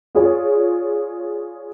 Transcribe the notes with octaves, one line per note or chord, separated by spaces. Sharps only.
F4 G#4 C#5 D5